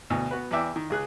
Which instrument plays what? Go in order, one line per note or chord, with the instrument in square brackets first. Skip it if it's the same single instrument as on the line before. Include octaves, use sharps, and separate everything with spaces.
[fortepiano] D2 B2
B3 F#4 B4
E2 E3 D5 E5 G5
D#3
C#2 G#4 F#6